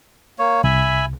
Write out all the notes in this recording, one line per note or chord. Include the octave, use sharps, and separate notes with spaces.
A#3 C#5
C2 E5 G#5 B5